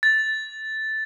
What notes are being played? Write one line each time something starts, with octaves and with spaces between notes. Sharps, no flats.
A6